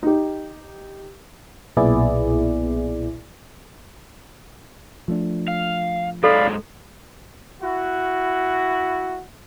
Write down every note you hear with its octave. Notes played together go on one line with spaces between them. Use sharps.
D#4 G4
B1 A#2 B3 E4 G#4 D5
F3 A3 D4
F5
G#2 F#3 G#3 A4 D5 F5 B5
E4 F#4